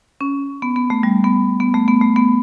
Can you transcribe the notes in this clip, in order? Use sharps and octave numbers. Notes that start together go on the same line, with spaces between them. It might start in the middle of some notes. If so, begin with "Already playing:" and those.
C#4
B3
B3
A3
G3
B3
B3
A3
B3
A3
B3